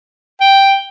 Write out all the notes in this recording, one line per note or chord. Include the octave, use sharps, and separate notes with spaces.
G5